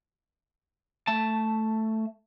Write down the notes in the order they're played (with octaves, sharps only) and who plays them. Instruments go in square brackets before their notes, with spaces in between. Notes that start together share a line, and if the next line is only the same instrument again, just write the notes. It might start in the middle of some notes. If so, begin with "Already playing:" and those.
[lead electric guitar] A3 A5